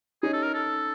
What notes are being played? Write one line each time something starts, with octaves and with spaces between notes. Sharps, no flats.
C#4 D#4 G#4
A4
A#4
A4